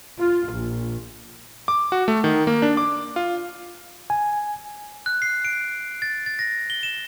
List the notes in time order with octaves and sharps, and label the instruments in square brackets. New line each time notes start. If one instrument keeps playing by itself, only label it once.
[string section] F4
A#1
[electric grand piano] D6
F#4
A3
D#3
A#3
D4
D6
F4
[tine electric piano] G#5
[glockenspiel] F#6
C7
D7
A6
A6
A#6
G7
E7